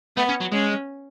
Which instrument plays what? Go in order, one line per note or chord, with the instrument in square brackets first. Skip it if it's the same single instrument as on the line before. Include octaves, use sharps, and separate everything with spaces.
[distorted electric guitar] A3 [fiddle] B3
[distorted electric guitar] C#4
F#3
[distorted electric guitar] G#3 [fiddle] C#4